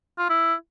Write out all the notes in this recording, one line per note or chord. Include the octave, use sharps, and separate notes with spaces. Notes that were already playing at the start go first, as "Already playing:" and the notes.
F4
E4